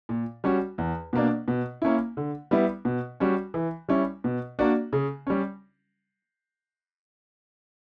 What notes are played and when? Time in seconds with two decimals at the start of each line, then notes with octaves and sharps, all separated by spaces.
0.09 A#2
0.44 G3 C#4 F#4
0.78 E2
1.13 B2 A#3 D4
1.48 B2
1.82 A#3 C#4 E4
2.17 D3
2.51 G3 B3 E4
2.85 B2
3.20 G3 C#4 F#4
3.54 E3
3.89 G3 C#4 E4
4.24 B2
4.59 A#3 D4 F#4
4.93 C#3
5.27 G3 C#4